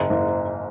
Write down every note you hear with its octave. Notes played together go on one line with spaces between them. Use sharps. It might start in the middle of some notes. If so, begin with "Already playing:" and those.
Already playing: F#1 G#2
F#1